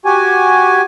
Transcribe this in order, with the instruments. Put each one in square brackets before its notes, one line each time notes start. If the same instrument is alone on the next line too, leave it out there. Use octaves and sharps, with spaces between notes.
[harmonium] F#4 G4 G#5